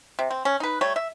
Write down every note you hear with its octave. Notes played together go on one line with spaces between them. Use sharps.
C3
C4
C#4
D#4 B4
G3 A3 C#5
E5